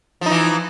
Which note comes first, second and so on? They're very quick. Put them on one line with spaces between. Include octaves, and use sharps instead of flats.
F3 D#4 E3